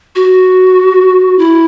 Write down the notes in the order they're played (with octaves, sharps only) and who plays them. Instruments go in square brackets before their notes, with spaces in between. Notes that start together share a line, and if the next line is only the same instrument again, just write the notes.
[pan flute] F#4
E4